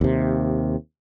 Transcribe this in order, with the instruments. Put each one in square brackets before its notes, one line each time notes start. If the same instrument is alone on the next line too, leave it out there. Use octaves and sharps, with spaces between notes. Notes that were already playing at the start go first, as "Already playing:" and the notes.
[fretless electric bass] D#2 C3